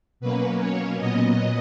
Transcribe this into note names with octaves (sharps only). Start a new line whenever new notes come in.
B2 F#3 A#3 C#4 B4
C#5
A#2 F#3 B3 D#5